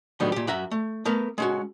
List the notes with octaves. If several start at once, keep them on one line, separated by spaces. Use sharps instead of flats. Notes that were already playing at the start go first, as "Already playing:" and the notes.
A2 D3 D#3 F#3 G3 B3
A#2 G4
F#2 F#4 E5 A#5
A3
A3 B3 A#4
G#3 C#4 F#4